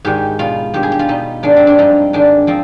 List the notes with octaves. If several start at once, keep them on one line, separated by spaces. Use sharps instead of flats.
G#2 D#3 G4
B2 F4
G2 D#3 G4
G#4
G4
F4
B2 D#4
G#2 D#3 D4
C4
D4
G2 F3 D#4
G#2 D#3 D4
F3 C4